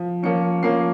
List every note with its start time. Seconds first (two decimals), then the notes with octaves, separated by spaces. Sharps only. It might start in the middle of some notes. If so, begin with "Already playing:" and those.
Already playing: F3
0.23 F3 A#3 C#4 C#7
0.63 F3 A#3 C#4 C7